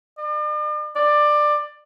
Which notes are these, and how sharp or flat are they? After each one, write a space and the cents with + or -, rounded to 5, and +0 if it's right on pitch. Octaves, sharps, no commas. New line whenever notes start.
D5 +40
D5 +15